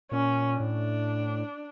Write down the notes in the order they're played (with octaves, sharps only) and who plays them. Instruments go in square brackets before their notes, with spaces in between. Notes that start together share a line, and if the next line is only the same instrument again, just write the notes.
[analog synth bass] A#2 [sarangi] C#4
[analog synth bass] A2 [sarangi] D4